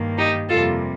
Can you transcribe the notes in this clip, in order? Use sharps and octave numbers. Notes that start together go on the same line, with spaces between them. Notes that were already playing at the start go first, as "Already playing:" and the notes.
Already playing: G2 D#3 A#3
D#4 G4
F2 C3 G3 A#3 F4 A4